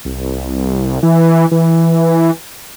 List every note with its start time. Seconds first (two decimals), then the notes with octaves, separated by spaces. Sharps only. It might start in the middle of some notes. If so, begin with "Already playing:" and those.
0.05 C2
1.03 E3
1.51 E3